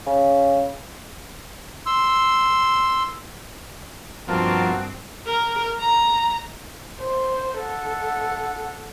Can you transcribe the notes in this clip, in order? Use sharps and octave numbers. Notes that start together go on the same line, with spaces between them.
C#3
C6 E6
G2 B2 F3 A#3 C4 F#4 A#4 A5
A#4
A#5
C5
A4 F#5